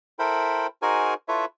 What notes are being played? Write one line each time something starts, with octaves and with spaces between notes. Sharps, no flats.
E4 A4 A#4 C5 G5 B5
D#4 F#4 G#4 A#4 C5 G#5
E4 F4 A4 B4 C#5 E5